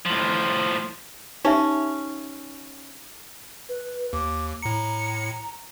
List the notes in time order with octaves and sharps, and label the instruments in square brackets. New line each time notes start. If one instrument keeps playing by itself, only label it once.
[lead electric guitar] A2 F3
[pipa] C#4 [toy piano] D#4 G4 E5
[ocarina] B4
[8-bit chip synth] D#2 [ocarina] D6
[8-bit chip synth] A2 C#7 [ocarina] A#5